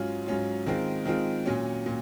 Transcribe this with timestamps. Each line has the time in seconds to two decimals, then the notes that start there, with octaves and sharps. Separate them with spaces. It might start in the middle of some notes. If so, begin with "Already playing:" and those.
Already playing: G#2 F#3 C#4 F4
0.27 G#2 F#3 C#4 F4
0.66 D#3 G#3 C4 F4
1.05 D#3 G#3 C4 F4
1.46 A#2 F#3 C#4
1.86 A#2